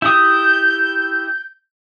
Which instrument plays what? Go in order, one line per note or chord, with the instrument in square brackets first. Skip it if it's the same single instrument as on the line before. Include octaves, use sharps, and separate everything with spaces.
[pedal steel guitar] E4 G4 D#6 [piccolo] G6